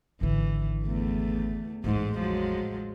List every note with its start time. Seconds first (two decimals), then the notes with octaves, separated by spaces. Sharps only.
0.21 G#1 D3 E3
0.84 E2 A3
1.84 A1 E2 G#2 G#3
2.19 F3 F#3 G#3